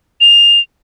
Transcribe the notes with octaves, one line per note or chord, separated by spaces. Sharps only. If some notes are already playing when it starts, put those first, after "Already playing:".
F7